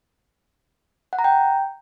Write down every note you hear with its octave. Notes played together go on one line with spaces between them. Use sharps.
F#5
A#5
G5